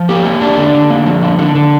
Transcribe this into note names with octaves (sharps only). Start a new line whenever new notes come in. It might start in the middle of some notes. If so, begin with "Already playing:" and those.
Already playing: F3
A#3 G4
A#3
D4
D3
D3
A#3
F3
D3
D3
D3